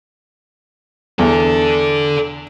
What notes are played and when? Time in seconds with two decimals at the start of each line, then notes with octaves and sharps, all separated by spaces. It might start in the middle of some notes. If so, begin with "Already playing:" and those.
1.19 E2 D4 A4